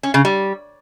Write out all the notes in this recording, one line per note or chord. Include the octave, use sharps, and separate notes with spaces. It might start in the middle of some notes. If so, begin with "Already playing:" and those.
C#4
C#3
G3